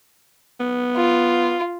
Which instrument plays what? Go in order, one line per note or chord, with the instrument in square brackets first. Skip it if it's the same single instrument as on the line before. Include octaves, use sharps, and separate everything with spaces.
[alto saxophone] B3
[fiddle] F4